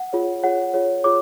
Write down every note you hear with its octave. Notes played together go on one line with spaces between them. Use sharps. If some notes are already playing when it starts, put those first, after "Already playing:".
Already playing: F#5
F4 G#4 C#5
F4 G#4 C#5 F#5
F4 G#4 C#5
F4 G#4 C#5 D6